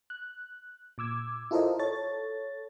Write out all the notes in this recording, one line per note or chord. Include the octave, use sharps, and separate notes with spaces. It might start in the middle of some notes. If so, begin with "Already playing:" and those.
F#6
A#2 D6 E6 G#6
E4 F4 A4 A#4 C5 D#5
A4 C#5 A6